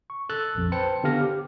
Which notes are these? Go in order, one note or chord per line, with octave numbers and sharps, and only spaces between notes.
C#6
A4 E6 F#6 A6
A#1 F2
B4 C5 G5 A5 C#7
D3 B3 G4 F5 F6 A#6
G4